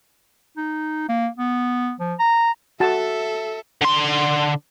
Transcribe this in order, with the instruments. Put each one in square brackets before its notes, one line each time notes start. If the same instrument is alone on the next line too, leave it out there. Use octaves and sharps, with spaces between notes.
[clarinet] D#4
A#3
B3
F3
A#5
[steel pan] F#4 A5 [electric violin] A4 E5
[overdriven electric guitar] D3 C6